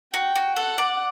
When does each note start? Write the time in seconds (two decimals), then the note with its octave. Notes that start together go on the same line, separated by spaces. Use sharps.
0.14 F#4 G5
0.36 F#4
0.56 A4 F#5
0.78 D5